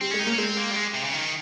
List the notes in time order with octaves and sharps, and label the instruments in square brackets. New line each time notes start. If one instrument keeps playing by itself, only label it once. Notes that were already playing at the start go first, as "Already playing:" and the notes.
[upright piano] G3 [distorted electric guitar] C4
[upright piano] G#3 [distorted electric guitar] C#4
[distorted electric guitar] D#4
[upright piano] A#3
[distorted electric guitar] C#4
[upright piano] G#3 [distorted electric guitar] C4
[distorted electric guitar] A#3
G3
G#3
C3
C#3
D#3